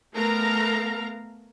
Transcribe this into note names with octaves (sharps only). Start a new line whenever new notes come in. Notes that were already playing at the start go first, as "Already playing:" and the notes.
A3 B3 A#4 F5 A#5